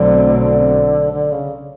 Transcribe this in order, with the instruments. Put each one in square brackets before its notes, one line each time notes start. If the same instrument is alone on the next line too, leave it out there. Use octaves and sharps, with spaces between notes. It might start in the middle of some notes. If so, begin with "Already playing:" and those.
Already playing: [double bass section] B1 B2 F#3 A3 C4 [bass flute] D3
[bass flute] D3
D3
C#3